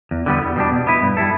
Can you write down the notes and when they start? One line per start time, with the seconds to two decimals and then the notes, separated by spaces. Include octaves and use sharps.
0.11 E2
0.26 D3 G3 B3
0.42 E2
0.56 B2 G3 D4
0.72 B2
0.87 B3 E4 B4
1.02 G2
1.17 G3 E4 A4